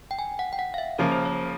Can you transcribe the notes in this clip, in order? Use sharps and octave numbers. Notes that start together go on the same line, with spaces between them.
G5
G#5
F#5
G5
F#5
F5
E5
C#3 F3 A#3 A#4
C5
C#5